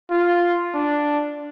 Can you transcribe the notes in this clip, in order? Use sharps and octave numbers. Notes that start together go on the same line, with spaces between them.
F4
D4